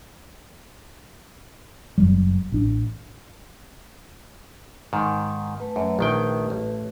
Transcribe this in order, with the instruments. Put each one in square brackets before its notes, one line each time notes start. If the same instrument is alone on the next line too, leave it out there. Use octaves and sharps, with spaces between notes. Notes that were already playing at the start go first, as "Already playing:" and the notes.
[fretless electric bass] F#1 E2 F#3 G3
A1 D4
[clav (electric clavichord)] G#2 D#3
[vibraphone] A3 B4
[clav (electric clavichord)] F#2
A#1 D#3 G5
A1